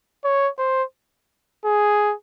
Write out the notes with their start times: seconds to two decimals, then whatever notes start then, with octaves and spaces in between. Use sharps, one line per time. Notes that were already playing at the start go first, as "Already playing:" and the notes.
0.24 C#5
0.58 C5
1.65 G#4